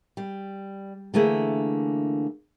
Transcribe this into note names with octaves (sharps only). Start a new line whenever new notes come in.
G3
D3 E3 A3 A#3 G#4 E5